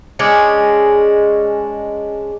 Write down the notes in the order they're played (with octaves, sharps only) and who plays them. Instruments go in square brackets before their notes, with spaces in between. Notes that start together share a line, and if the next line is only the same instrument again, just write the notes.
[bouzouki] G#3 C#4 D4